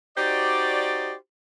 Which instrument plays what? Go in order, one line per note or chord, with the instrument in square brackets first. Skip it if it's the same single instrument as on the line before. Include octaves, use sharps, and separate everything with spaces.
[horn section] D#4 F#4 G4 C5 D5